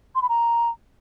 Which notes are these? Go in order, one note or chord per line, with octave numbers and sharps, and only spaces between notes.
C6
B5
A#5